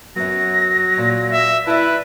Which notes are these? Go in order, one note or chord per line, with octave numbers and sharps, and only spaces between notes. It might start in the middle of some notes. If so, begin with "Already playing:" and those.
F#2 F#3 B3 A#6
A#2
E5
E4 B4 D5 A5